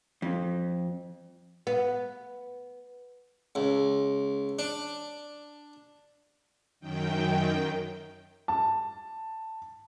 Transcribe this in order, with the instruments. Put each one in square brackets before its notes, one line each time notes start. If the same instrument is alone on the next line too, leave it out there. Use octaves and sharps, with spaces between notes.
[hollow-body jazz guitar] F2
[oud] B3
[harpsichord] C#2
D4
[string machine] F#2 D#3 G5
[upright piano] A5